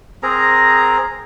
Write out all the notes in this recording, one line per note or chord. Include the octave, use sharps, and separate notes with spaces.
C4 G#4 A#4 A#5